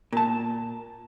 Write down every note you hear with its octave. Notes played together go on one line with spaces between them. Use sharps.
A#2 A5